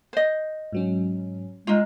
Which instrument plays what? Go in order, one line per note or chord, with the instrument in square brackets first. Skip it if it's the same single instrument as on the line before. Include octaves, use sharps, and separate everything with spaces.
[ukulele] C5 D#5
[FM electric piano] G#2 F#3 C#4
[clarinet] G#3 [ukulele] D#4 F4